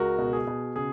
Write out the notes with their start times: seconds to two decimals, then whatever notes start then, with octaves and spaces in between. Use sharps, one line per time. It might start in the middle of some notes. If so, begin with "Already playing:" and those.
Already playing: C#2 F#4 A#4
0.18 B2
0.33 G#4
0.47 B2
0.76 C#3 G#4